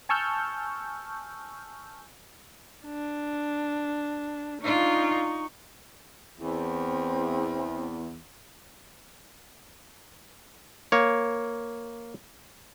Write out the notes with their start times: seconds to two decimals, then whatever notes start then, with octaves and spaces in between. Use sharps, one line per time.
0.09 G#5 A5 C#6 E6 F6 G6
2.86 D4
4.62 D4 D#4 F4 C#6
6.40 E2 C4
10.92 A#3 C#5